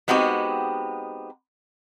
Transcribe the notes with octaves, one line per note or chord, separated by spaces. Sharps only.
G#3 B3 C4 D#4 F#4 G4